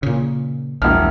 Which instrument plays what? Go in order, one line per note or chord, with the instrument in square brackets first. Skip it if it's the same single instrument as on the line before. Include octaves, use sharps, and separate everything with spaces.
[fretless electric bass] A#2 C#3
[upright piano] E1 E4 F6 [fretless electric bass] A#1